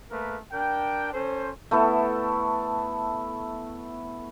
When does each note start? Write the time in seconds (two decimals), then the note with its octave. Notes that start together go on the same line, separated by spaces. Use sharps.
0.11 A3 A#3 A#4 B4
0.52 D4 A#4 G5
1.13 C#4 A4 C5
1.71 A3 B3 E4 A4